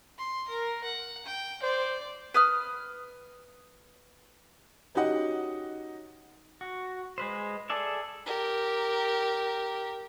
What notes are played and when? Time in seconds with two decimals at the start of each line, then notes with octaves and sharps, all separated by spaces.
0.18 C6
0.49 A#4
0.84 F#5
1.26 G5
1.62 C5 D5
2.34 B4 D#6 F6
4.95 C#4 D#4 F#4 G4 D#5 F#5
6.61 F#4
7.18 G#3 B4 C5
7.70 G#4 A4 D5 E5
8.26 G4 A#4